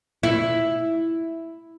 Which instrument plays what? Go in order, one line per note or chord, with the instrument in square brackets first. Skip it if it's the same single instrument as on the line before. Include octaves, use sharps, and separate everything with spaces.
[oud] E4